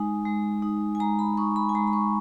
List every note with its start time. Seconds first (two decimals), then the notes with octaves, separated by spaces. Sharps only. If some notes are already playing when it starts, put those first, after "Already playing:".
Already playing: G#3 D#4 G#5
0.25 G#3
0.62 D#4
0.95 G#5
1.00 G#3 A#5
1.19 B5
1.37 D#4 C#6
1.56 B5
1.69 G#5
1.75 G#3 A#5
1.87 B5
1.93 C#6